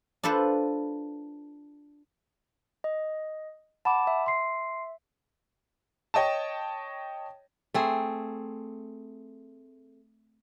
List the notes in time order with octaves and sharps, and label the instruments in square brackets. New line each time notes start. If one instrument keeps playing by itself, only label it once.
[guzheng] D4 F4 A4 B4 C5
[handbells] D#5
[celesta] F#5 B5 E7 [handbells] A5 D6
[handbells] E5
[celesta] C6 C7
[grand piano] C#5 D#5 G5 A5
[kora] A3 C4 G#4